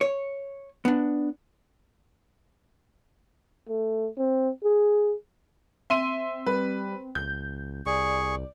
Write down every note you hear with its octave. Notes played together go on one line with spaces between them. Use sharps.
C#5
B3 D4
A3
C4
G#4
C4 E5 C6 D#7
G3 B4
C#2 G6
C2 G#4 D5 C#6